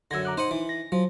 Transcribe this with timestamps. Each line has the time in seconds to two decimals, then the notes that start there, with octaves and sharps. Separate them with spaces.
0.11 F#2 D3 E6 G#6 A#6
0.25 A#5 D6 F#6
0.38 D#4 C5 D#5 F#5
0.51 E3
0.69 A#6
0.92 F3 F#3